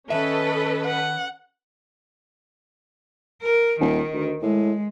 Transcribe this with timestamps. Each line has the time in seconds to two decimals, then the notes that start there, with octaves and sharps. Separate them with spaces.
0.10 D#3 C#4 A4 B4 D#5 E5
0.86 F#5
3.42 A#4
3.81 D#1 D#3
4.13 D2
4.42 A2 G#3